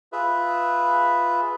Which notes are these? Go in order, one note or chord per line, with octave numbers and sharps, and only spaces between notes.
F4 G#4 B4 E5